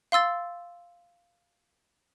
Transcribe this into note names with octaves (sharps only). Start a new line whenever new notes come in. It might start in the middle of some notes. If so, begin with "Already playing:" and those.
F5 C6 E6 A6